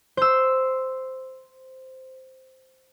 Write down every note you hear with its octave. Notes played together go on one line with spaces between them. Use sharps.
C5 E6